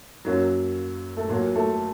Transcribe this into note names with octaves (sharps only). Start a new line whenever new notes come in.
F#2 F#3 A#3
A3
A#2 F#3 A#3
A3